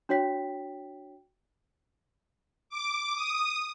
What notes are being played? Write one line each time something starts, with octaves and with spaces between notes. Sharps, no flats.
D4 F#4 C#5 G5 B6
D6
D#6